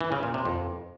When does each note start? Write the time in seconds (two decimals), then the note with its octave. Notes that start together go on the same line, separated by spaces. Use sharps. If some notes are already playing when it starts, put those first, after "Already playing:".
0.01 E3
0.12 C#3
0.23 A#2
0.34 C3
0.45 F2